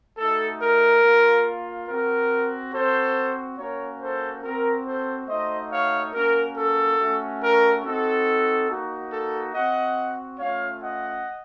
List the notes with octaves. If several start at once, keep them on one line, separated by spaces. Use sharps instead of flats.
A3 D#4 F#4 A4
A#4
A#3 F4
C4 F#4 A#4
C4 F#4 A4 C5
A#3 C#4 F#4 A#4 C#5
A4 C5
C4 F#4 A#4
A4 C5
A3 D#4 F#4 C5 D#5
C#5 F5
A#3 C#4 F#4 A#4
A4
A3 C#4 F#4
A#4
C4 D#4 F#4 A4
A#3 D#4 F#4
A4
C4 F#4 D#5 F#5
A3 C#4 F4 C#5 F5
D#5 F#5